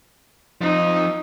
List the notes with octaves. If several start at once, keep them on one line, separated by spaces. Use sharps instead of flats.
F3 C4 D#4